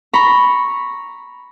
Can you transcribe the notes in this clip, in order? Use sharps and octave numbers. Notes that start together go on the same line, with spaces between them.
A#5 B5 C#6